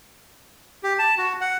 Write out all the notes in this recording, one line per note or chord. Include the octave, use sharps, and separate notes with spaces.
G4
A5
F#4
F#5